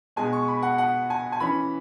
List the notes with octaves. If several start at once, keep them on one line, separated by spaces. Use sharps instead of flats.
B2 G#3 B3 G#5
C#6
B5
F#5
F#5
G#5
G#5
E3 C#4 B5